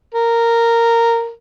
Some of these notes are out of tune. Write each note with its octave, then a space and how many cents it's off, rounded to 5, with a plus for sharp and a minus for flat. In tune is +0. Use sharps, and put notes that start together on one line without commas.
A#4 -10